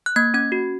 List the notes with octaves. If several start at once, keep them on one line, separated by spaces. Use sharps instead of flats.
F#6
A#3 G#6
C#4 G#6
F#4